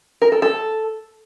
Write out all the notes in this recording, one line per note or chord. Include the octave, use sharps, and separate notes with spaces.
A#4
A4
A4